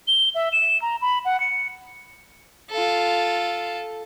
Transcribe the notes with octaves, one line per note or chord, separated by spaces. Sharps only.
G7
E5
E7
A#5
B5
F#5
C#7
F4 A4